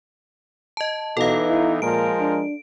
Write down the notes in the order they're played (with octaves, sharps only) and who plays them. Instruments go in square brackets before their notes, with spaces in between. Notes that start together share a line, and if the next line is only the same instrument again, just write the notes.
[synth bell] D#5 A5
[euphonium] B2 [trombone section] E3 B3 D#4 [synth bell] A4 F5
[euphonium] E4
[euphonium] A#2 [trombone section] F3 G#3 A#4 [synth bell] D7
[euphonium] D4